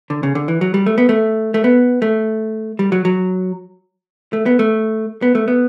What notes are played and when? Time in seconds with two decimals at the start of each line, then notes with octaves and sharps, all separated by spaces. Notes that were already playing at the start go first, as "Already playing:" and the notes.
0.10 D3
0.23 C#3
0.35 D3
0.48 E3
0.61 F#3
0.74 G3
0.86 A3
0.98 B3
1.09 A3
1.54 A3
1.64 B3
2.02 A3
2.79 G3
2.92 F#3
3.05 F#3
4.33 A3
4.46 B3
4.59 A3
5.22 B3
5.35 A3
5.48 B3